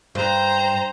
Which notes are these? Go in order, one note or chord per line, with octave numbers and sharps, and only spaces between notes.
G2 C5 A#5